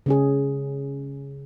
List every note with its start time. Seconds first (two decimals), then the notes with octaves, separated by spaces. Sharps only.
0.06 C#3 C#4 G#4